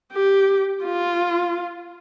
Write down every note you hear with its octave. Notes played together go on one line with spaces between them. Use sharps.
G4
F4